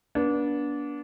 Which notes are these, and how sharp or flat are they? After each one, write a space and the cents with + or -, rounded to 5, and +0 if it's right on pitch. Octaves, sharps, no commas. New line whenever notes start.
B3 -40 D4 -20